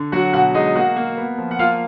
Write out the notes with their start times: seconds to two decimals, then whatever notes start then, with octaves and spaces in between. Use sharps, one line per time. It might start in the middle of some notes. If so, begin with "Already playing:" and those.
Already playing: D3
0.12 F#3 F#4 F#5
0.33 B2 F#4 F#5
0.54 G#3 D#4 D#5
0.75 A#3 F#4 F#5
0.96 A#3
1.17 B3
1.38 F3
1.51 F#5
1.59 A#3 F4 F5